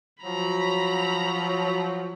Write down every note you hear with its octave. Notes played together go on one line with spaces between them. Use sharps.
F3 F#3 A#5 B5